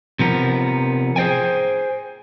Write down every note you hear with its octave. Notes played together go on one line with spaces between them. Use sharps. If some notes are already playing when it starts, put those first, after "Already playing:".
C3 F3 B3 A#4
G#4 C5 D5 G5 G#5